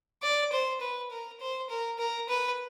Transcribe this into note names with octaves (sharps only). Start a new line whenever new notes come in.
D5
C5
B4
A#4
C5
A#4
A#4
B4